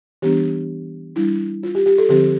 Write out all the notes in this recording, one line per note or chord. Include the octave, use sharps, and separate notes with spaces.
E3 G3 B3 D4 G4
G3 D4 E4
F4
G4
G4
A4
D3 F3 C4 G4